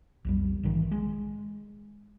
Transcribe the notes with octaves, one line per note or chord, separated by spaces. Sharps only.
B1 F2 G3
A#1 G#2 D#3 E3
G#3